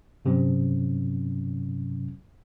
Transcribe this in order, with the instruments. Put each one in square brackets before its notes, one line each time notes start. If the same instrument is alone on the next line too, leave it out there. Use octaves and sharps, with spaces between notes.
[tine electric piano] G2 C3 F#3 C#4